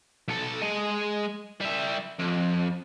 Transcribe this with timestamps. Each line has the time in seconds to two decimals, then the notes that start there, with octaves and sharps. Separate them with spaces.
0.28 B1 A4
0.61 G#3 D#5
1.61 G3 E5
2.19 F2